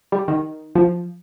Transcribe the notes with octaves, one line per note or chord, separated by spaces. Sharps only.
G3
D#3
F3